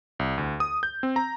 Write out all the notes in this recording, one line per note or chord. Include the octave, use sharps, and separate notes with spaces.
C2
D2
D#6
G6
C4
A#5